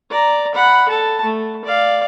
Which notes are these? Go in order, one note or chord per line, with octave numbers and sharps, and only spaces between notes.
D5 A#5
F#5 B5
A4 A5
A3
D5 F5